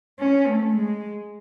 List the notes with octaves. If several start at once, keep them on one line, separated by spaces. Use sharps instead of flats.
C#4
A3
G#3